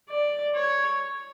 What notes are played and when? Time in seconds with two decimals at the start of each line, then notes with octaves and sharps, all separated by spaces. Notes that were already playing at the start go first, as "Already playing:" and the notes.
0.10 D5
0.55 C#5